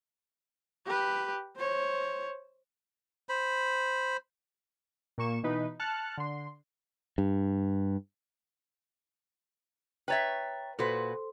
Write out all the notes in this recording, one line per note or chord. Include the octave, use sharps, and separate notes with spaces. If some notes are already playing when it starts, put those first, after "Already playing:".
G4 B4
C5 C#5
C5 B5
A#2 A#3 C#6 E7
B2 E3 D#4 B4
A5 F6 F#6 C#7
D3 C6
G2
B4 C#5 E5 G5 A#5 A6
A#2 F#4 A4 B4 C5 C6